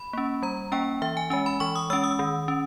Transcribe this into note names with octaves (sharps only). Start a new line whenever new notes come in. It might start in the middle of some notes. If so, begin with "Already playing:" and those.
Already playing: B5
A#3 C#4
G3 A#5
A#3 C#4 G5
E3 E5
G#5
G#3 C#4 G#5
B5
E3 C#6
D#6
G#3 C#4 E6
D#6
D#3
C#4